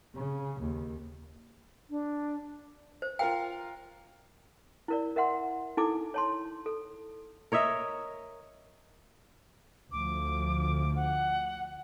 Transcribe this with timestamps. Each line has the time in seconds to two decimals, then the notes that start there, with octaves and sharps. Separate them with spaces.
0.15 C#3
0.60 D#2
1.90 D4
3.02 C5
3.19 F4 A#4 F5 G5
4.88 E4 A#4 D5
5.16 A#4 E5 F#5 C6
5.77 D#4 E4 A4 G#5 D6
6.14 C#5 A5 C6
6.66 A4
7.52 A#4 C#5 D#5 E5
9.92 D2 F3 D6
10.96 F#5